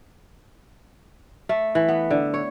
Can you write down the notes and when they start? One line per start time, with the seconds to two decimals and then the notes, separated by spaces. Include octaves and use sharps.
1.49 A3
1.75 E3
1.88 B3
2.10 D3
2.34 C#5